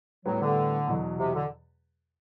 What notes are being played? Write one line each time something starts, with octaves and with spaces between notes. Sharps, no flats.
A2 F#3 G3 B3
D3
E2 B2 F#3
C3
D3